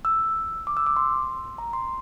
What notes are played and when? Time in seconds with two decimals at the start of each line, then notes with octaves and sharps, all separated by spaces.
0.05 E6
0.67 D6
0.77 E6
0.86 D6
0.96 C6
1.58 A#5
1.73 C6